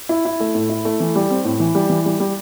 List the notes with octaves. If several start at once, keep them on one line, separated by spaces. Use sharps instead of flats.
E4
E4
A3
A2
E4
A3
E3
G3
C4
A2
E3
G3
E3
G3
G3